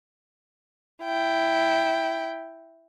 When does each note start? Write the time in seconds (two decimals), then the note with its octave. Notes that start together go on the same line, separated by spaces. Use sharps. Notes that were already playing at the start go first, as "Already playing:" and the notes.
1.04 E4 G5